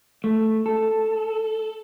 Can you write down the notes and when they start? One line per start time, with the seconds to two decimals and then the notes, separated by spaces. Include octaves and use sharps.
0.24 A3
0.66 A4